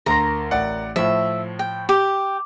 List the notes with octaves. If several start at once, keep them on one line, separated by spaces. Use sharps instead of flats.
D2 A#4 A#5 C6
A1 D5 F#5
A2 F3 E5
G5
G4